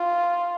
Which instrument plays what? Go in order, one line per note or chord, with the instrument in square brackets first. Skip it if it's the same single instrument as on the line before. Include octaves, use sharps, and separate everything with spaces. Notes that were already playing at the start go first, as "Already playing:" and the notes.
Already playing: [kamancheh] F4